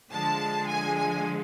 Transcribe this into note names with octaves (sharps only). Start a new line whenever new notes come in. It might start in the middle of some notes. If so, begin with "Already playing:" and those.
D3 F3 G#3 A5
G#5
G#5